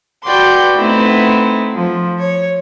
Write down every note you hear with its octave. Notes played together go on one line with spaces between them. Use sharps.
F#4 B4 D5 G5 C6
A3 B3 C4 D#4 E4
F3
C#5